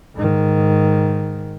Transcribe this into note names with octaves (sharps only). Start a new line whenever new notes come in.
G#2 D#3